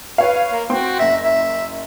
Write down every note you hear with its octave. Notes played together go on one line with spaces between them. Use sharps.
B4 C#5 F5
A#3
C4 F#4 G5 C6
F#1 E5 A#6
E5